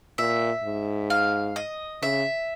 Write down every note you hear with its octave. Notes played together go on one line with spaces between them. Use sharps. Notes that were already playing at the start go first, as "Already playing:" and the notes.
A#2 E5
G#2
F5
D#5
C#3 E5